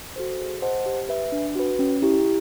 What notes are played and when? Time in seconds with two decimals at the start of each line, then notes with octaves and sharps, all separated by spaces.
0.16 F#4 A4 C5
0.40 G#4
0.62 C5 D#5 F#5 A5
0.86 G4
1.09 B4 E5
1.32 D4
1.55 F#4 B4
1.79 C#4
2.02 E4 G4